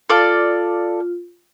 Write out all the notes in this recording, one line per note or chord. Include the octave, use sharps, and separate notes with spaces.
F4 A4 D5 F5